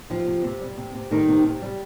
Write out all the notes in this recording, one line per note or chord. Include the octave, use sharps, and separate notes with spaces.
C3 F3 F4
C3
C3
G3
C3
C3
D#3 G3 D#4
C3
C3
G3